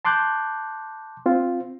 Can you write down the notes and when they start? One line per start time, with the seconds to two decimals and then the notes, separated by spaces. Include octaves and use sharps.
0.05 A5 C6 D6 F#6 G6
1.26 C4 F4